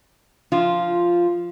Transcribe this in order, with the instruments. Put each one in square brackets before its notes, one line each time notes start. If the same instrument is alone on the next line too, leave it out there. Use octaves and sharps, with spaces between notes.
[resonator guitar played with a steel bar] F3 F4